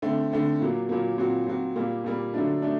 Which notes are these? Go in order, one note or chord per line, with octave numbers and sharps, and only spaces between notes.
D3 A3 C4
D3 A3 C4
A#2 F#3 A#3
A#2 F#3 A#3
A#2 F#3 C4 F#4
A#2 F#3 C4 F#4
A#2 G3 A#3
A#2 G3 A#3
D3 F#3 A3 D4
A3 D4